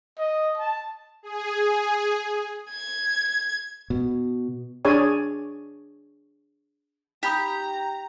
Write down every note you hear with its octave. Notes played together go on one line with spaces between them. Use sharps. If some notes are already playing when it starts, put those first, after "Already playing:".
D#5
A5
G#4
G#6
B2
D4 G#4 C#5 D5 G#5
D#4 G4 A#5 B5 D#6